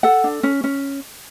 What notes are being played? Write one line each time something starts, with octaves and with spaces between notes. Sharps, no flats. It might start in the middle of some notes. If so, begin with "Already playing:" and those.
A4 F#5
D4
C#4
C#4